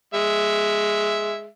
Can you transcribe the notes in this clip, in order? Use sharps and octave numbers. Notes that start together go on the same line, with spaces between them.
G#3 E5